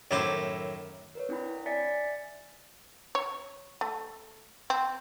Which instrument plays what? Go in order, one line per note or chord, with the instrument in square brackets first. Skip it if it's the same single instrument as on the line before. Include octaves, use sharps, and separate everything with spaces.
[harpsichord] F#2 A2 D#3 E4 C5 D6
[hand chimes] A#4 B4 C#5
C4 D4 E4 G5 B5
D5 E5 G#5 A6 B6 C#7
[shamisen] C#5
A3
C4